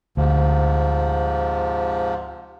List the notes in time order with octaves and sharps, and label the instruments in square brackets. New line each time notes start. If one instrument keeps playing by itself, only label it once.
[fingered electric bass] D2 [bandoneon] G#2 C3 F3